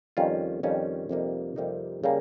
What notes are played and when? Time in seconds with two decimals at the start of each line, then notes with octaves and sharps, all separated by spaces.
0.17 F2 D#3 G3 C#4 F4
0.63 F2 D#3 G3 C#4 F4
1.09 F2 C3 G3 A#3 D#4
1.56 F2 C3 G3 A#3 D#4
2.04 C#3 G3 A#3